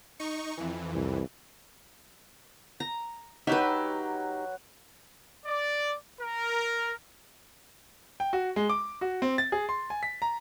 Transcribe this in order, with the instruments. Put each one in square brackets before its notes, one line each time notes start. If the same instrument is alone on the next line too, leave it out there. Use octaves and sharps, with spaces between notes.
[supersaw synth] D#4 C#6
F2 E3
[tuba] C2
[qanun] A#5
[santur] F#3 F#4 [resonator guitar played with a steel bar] D#4 G4 [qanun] B4 E5
[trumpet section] D5
A#4
[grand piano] G5
F#4
G#3
D6
F#4
C4
A6
G#4
C6
G#5
B6
A#5